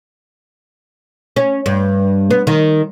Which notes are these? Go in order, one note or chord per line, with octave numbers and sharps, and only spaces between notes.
C#4
G2
B3
D#3